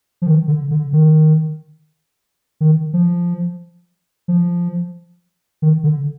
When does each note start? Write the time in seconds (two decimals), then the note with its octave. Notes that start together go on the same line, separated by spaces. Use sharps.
0.22 F3
0.27 D#3
0.48 D3
0.71 D3
0.93 D#3
2.61 D#3
2.93 F3
4.28 F3
5.62 D#3
5.84 D3